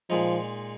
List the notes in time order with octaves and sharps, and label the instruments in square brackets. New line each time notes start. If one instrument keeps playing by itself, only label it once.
[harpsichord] A#2 G#3 D#4 [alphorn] F3